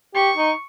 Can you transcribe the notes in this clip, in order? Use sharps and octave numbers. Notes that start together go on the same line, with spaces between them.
G4 C#6
D#4